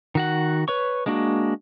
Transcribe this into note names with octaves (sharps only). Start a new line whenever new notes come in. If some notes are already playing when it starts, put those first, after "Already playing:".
D#3 F#4 F#5
B4 C#5 C#6
G#3 A#3 D4 F#4